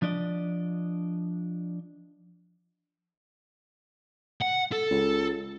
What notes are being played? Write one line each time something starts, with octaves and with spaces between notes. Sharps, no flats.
F3 D4 D5 D#5
F#5
A4
C#2